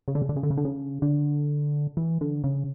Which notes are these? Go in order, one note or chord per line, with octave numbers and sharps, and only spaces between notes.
C#3
D3
C#3
D3
C#3
D3
C#3
D3
C#3
D3
E3
D3
C#3